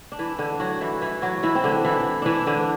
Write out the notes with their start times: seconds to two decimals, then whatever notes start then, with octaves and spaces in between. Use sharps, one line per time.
0.12 D4
0.19 E3 E4
0.39 D3 D4
0.60 F#3 F#4
0.81 E3 E4
1.02 E3 E4
1.22 F#3 F#4
1.43 E3 E4
1.55 C4
1.64 D3 D4
1.84 E3 E4
2.22 E3 D4 E4
2.47 D3 D4